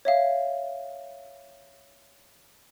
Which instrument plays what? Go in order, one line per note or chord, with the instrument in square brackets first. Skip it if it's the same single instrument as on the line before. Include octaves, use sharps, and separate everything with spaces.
[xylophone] C#5 E5 F5